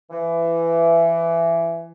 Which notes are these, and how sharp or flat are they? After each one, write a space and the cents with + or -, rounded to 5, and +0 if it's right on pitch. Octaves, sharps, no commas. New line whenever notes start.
E3 +20